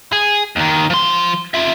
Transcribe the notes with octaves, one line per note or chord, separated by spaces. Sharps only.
G#4
D#2 D#3
F3 C6
F4 E5